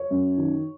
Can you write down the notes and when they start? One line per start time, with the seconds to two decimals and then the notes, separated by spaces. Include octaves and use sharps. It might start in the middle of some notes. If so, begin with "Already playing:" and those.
Already playing: C#5
0.11 F#2
0.38 D#3